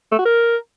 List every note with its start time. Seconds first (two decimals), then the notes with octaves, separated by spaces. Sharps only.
0.12 A3
0.19 F#4
0.25 A#4